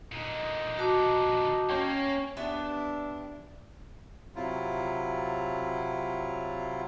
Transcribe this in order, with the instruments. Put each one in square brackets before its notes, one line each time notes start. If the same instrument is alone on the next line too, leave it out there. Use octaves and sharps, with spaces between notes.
[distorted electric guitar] A#2 D3 [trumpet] D#4
[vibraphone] F#4 A5 D6
[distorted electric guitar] A#3 [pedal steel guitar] C#4 C#5 G5
[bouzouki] B3 E4 G4 [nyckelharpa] D4
[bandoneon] C3 F#3 E4 F4